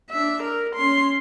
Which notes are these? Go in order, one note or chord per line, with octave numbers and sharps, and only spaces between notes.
D4 E5
A#4
C#4 C6